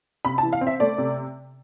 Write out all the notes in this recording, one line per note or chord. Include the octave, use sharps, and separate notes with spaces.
C3 B5
A5
E3
F5
C4
E5
A3 D5
C3